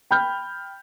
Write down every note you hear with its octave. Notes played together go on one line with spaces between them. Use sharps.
G5 B5 F6 G6